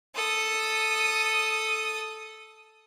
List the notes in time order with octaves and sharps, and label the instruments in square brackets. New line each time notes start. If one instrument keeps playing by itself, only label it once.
[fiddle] A4 D#6